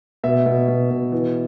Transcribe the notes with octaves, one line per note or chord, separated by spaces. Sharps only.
B2 E5
B2
B2
B2
E3